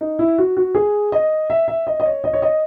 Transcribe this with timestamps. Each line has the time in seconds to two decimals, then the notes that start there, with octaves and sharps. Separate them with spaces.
0.01 D#4
0.19 E4
0.38 F#4
0.57 F#4
0.75 G#4
1.12 D#5
1.50 E5
1.68 E5
1.87 D#5
2.00 D#5
2.05 C#5
2.24 D#5
2.33 C#5
2.42 D#5